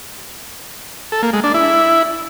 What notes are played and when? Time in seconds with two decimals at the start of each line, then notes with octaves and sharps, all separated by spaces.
1.12 A4
1.23 A#3
1.33 G#3
1.44 D4
1.54 E4